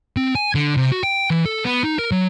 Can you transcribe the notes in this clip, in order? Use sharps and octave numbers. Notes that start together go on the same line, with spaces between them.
C4
G#5
D3
C3
F#4
G5
E3
A4
B3
D#4
A#4
F#3